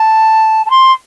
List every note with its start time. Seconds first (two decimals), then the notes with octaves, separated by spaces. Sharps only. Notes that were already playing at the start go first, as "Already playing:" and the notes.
Already playing: A5
0.66 A5
0.70 C6